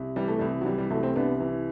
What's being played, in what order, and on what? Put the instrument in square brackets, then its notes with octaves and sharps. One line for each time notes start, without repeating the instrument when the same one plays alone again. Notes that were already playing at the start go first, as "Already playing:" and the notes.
Already playing: [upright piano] C2
E3 G3
A3
C2 G3
F#3
E3 G3
G3
C2 F#3 A3
A3 C4
C2 B3 D4
E3